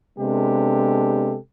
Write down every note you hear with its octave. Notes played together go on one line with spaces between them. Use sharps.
C3 G#3 B3 D4 G4 A4